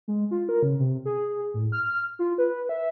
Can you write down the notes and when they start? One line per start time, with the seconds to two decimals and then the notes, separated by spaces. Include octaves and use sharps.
0.08 G#3
0.31 F4
0.49 A#4
0.63 C#3
0.79 C3
1.05 G#4
1.54 A2
1.72 F6
2.19 F4
2.38 B4
2.69 E5